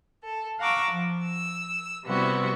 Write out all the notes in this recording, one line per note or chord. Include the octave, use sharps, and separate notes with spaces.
A4
F5 F#5 A#5 C#6 D6 E6
F3
E6
C3 G3 B3 C4 E4 F#4